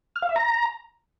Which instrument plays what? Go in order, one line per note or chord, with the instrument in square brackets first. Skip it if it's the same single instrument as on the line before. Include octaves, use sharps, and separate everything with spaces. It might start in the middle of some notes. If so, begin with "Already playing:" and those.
[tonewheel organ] F6
F5
E5
A#5